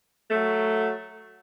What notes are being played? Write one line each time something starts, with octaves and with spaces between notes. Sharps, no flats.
F#3 A3